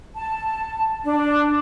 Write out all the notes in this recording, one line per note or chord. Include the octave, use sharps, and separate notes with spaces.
A5
D4